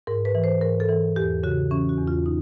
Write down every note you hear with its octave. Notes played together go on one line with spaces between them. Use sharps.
G#2 A#4
B4
E3
C5
G#2 A#4
A4
E3
E2 G4
C#3 F#4
E3 C#4
F#4
E2
F4
D#4